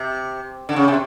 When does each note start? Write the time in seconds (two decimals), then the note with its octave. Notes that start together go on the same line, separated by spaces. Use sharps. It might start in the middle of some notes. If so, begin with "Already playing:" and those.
Already playing: C3
0.69 D3
0.76 C#3
0.88 C3